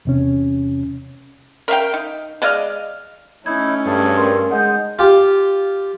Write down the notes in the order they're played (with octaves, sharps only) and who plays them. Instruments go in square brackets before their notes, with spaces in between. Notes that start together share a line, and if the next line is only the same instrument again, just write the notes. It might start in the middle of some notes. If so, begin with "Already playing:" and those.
[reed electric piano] E2 C3 C#4
[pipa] A#4 E5 F5 G5
D#4
G#3 D5 D#5 F5
[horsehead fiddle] A3 C#4 [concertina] D#4 E4 [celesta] G#6
[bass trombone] G2 [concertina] G#4 A4
[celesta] A#4 C6
[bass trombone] G#3 [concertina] D#4 [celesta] F#5 G6
[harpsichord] F4 G4